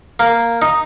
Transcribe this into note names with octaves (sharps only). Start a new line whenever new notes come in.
A#3
D#4